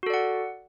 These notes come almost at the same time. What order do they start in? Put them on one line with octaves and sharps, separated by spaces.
F#4 A4 D5 F#5